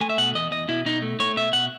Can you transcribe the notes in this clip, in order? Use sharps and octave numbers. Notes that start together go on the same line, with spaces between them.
A3 G#5
E5
B2 F#5
E2 D#5
E2 D#5
B2 E4
B2 D#4
A3
A3 C#5
B2 E5
B2 F#5